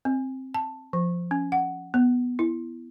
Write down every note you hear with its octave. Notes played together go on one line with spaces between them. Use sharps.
C4
A5
F3
C#4
F#5
B3
E4